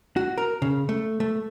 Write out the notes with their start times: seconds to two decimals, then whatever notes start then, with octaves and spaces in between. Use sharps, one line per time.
0.16 F#4
0.38 A#4
0.62 C#3
0.89 A3
1.20 A3